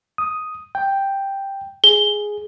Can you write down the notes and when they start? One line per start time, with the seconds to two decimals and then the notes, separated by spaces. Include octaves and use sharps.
0.18 D#6
0.75 G5
1.84 G#4 G7